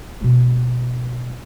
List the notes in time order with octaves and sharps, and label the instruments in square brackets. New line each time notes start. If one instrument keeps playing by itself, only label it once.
[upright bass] B2 G#3